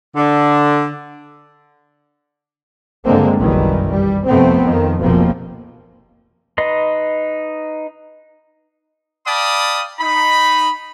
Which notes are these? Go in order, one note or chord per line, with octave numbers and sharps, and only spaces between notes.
D3
G2 D3 G#3 A#3 C4
F#1 B1 D#3 E3 G3
G3
F2 C3 A3 B3 C4
F2 D#3 F3
F1 A#1 B2 F3 A#3 C4
D#4 B4 D#5 C6
D5 F5 G5 A5 B5 D#6
D#4 B5